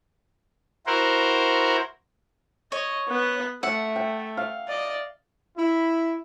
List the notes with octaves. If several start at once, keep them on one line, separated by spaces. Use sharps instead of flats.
E4 F#4 A#4 C5
C#5 D#5
B3 F#6
A3 E5 F#5
G5
F5
D5 D#5
E4